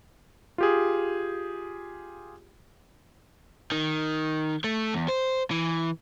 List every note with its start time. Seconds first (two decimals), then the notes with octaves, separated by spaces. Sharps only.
0.58 F4 G4 G#4
3.72 D#3
4.64 A3
4.93 E2
5.08 C5
5.51 E3